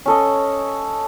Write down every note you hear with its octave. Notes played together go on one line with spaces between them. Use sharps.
C#4 A4 D#5